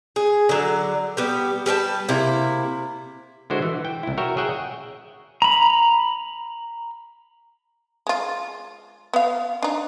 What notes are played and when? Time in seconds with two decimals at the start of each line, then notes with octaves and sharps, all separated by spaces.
0.16 G#4
0.49 D3 F#3
1.17 G3 B3 G4
1.66 G3 B4 G5 A5
2.09 C3 A#3 E4
3.50 D3 G#3 E4 F#4 C5
3.62 E3
3.85 G5
4.03 C2 E4
4.17 F#4 A#4 C#5 E5 G5
4.37 G#4 C#5 E5 F#5 G5
5.42 A#5 B5
8.07 G#3 F4
9.13 B3 F5
9.62 D4 D#4